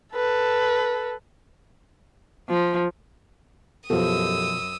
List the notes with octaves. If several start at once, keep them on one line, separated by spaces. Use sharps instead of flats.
A4 B4
F3
F#2 B2 F3 G4 A4 D#6 E6